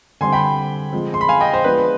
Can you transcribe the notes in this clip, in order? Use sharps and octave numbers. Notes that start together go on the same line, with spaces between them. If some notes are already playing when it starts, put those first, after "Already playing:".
D3 G3 C4 G#5 C6
G5 B5
F3 G#3 C4
C6
B5
F5 G#5
D#5 G5
C5
F3 G#3 B3 D4 B4